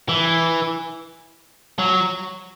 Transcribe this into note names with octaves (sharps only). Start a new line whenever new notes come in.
E3
F#3